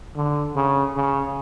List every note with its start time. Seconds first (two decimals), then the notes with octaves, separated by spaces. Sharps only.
0.16 D3
0.56 C#3
0.96 C#3